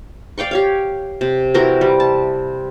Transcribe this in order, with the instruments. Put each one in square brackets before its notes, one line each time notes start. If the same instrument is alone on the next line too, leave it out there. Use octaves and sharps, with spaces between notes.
[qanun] D5 F5 G5 C#6
G4 C#5 F5
C3
E3 C4 F#4 A#4
G3
A5